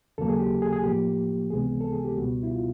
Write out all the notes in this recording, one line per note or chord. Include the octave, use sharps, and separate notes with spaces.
D#2 C#3 F#3 A#3 A4
G#4
G4
G#4
G#4
A2 F3 A#3 G4
C#2 C3 E3 G#3 B3 G#4
A4
G#4
G4
C#2 B2 G3 B3 F#4
E4
F4